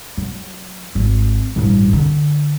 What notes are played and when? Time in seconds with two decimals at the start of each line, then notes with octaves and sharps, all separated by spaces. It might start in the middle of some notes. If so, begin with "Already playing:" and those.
0.17 F#3
0.95 G#1 C4
1.56 A1 G2
1.93 D3